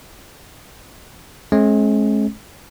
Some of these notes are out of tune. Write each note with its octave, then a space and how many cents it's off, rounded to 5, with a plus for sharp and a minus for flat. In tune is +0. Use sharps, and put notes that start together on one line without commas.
G#3 +40 C#4 -35